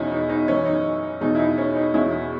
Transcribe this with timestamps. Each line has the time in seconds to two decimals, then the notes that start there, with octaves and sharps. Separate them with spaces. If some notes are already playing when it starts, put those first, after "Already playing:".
Already playing: E2 B2 C#4 D#4 E4
0.11 D#4
0.30 D#4
0.48 F#2 E3 C#4
0.66 D#4
1.21 E2 B2 D#4
1.35 E4
1.39 D#4
1.58 C#4
1.76 D#4
1.94 E2 B2 C#4 E4